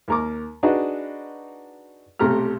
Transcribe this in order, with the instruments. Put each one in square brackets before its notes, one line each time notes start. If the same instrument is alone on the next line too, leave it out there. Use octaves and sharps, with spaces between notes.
[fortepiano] D#2 A#4 D6
D4 D#4 F#4 G#4 B4 D#5
B1 C3 A3 G4 A#5 F6